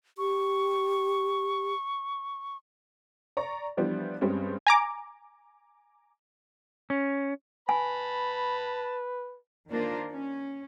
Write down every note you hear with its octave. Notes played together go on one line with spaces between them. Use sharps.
G4 C#6
D5 A#5 C#6
E3 F3 G3 B3 D4
G2 G3 G#3 C4 C#4
G#5 A#5 D6
C#4
B4 G#5 A5 B5
D#3 A#3 D4 F4 A#4 C5
C#4